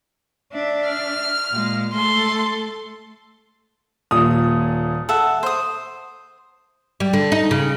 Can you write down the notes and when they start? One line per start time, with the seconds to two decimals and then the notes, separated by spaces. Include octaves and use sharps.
0.53 D4 E5
0.89 F6
1.52 A#2 G#3
1.94 A3 A4 C6
4.11 D#1 A#2 D#6
5.09 A4 E5 F#5
5.43 C5 D#6
7.00 G3
7.13 D3
7.32 D#4
7.51 C#3